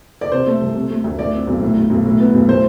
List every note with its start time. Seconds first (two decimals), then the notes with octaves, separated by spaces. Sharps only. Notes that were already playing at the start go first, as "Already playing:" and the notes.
0.21 D5
0.32 C3 C5
0.46 A3
0.61 C2
0.75 C3
0.90 A3
1.04 D2
1.19 A2 D5
1.33 C4
1.47 B1
1.62 A2
1.76 B1
1.90 B1
2.06 A2
2.20 B3
2.34 B1
2.48 A2 C5